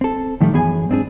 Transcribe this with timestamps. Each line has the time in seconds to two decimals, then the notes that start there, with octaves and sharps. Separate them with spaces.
0.01 C4 A4
0.41 A2 D#3 F3 G3 A3
0.53 F#2 E3 B3 G#4 G#5
0.89 G#2 C4 D4 G#4